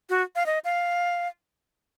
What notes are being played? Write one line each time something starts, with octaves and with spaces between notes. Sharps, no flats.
F#4
F5
D#5
F5